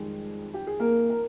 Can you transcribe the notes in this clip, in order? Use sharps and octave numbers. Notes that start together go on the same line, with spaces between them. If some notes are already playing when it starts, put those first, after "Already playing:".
Already playing: F2 D#3 G3 G#3 G#4
G4
G#4
A#3 A#4
A#4